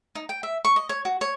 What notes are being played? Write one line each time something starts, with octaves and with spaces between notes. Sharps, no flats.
D#4
G5
E5
C#6
D#5
C#5
F#4
C#5